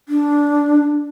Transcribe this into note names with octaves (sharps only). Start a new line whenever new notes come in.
D4